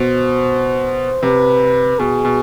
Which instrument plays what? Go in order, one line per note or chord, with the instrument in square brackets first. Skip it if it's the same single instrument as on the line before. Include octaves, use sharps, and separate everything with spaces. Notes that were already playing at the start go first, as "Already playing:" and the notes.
Already playing: [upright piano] B2 [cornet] C5
[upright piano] C3 [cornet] B4
[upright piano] B2 [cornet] G#4
[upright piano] B2